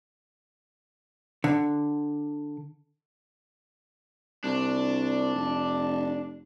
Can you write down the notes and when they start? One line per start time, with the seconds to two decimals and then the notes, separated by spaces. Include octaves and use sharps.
1.44 D3
4.44 C2 D4
5.35 F1